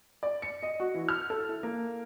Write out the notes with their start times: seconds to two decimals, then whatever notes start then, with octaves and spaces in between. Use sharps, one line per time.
0.23 D5
0.42 C#7
0.63 D#5
0.80 F#4
0.94 E3
1.09 F6
1.30 A4
1.49 E4
1.63 A#3